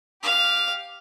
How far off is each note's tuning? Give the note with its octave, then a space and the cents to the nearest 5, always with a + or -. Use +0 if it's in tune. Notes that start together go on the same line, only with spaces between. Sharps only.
G4 +0 F5 +0